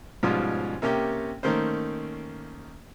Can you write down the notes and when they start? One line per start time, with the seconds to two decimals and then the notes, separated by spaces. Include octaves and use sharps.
0.23 G#2 B2 F3 G3 C#4 F4
0.82 C3 A#3 C#4 G4
1.43 D#3 A3 A#3 C#4 C5